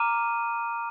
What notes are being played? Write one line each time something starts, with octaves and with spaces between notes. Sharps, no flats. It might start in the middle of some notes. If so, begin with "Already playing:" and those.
Already playing: A#5 D6 F6 D#7